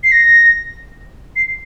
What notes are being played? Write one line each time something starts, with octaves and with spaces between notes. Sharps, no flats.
C7
A#6
C7